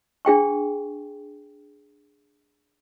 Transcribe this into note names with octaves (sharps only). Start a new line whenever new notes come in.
D4 G#4 G5 C#6